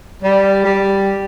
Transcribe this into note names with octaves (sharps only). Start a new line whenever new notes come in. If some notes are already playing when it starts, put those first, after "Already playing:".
G3
G3